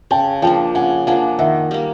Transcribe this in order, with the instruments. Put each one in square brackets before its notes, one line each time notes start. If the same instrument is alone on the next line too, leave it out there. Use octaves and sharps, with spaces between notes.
[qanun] C#3 [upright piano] G5 A5
[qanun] F3 A#3 D4 [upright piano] G5 A5
[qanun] C#3 [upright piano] F#5 G#5
[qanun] F3 A#3 D4 [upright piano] F#5 G#5
[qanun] D#3 [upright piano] E5 F#5
[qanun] G3 A#3